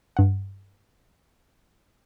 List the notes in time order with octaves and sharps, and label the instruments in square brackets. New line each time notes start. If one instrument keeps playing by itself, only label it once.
[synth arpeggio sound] G2 F#5